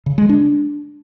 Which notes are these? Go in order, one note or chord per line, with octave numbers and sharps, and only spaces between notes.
C#3
G#3
D4